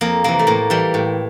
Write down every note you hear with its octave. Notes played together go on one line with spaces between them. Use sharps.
F2 A#3
C3 E3 A#3
A3
A2 A#3
E3 G3
A2